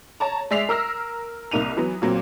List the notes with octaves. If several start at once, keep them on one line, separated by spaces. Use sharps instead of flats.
C#5 A5 A#5
G#3 D5 E5 B6 C7 F7
A#4 E6 F6 A#6
C2 A#3 D#4 D#7 F7
E3 F#3 B3
A#2 F#3 C4